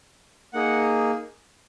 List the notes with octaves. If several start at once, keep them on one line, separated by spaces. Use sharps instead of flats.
A#3 D#4 G#4 F#5